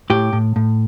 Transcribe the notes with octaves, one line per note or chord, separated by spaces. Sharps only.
A2 G4
A2
A2